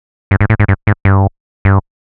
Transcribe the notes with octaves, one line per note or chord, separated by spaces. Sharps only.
G2
G#2
A2
G#2
G2
G#2
G2
G2